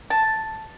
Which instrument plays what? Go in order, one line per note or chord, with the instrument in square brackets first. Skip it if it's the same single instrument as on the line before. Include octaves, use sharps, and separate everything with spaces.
[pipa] A5